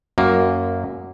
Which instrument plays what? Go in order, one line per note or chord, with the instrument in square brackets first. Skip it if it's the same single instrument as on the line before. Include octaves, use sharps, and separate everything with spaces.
[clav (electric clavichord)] F#2 A#3